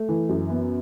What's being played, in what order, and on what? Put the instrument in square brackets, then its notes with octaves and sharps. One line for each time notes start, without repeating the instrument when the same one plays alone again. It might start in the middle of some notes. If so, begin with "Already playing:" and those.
Already playing: [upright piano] A3
E3
F#2
B3